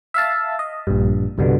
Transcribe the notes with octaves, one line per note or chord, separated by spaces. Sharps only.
E5 F5 A5
D#5
A#1 G2
C2 G2 B2 D3